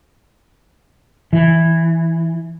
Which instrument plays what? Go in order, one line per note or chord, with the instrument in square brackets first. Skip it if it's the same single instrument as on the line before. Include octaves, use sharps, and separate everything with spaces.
[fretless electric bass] E3